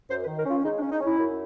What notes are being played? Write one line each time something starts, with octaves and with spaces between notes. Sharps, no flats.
F#2 C5
B4
D#3
A#4
C#4 F4
G#3 D#4
D4
C#4
D#4
C#4 E4
F#2